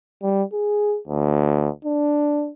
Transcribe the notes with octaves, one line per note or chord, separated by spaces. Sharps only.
G3
G#4
D2
D4